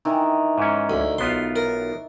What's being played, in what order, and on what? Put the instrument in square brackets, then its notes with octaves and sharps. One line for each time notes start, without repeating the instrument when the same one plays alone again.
[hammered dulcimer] D#3 E3
[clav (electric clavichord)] G#2 C#4
[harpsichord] D2
[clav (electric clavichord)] B1 B3 F4 [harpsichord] C6
[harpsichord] A#4